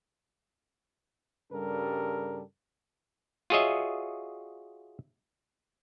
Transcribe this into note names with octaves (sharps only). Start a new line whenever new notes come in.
G2 C#3 G3 A4 A#4
F4 F#4 G#4 C#5 D#5 E5